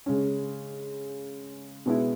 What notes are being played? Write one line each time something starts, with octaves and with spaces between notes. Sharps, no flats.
C#3 G#3 C#4
B2 G#3 B3 E4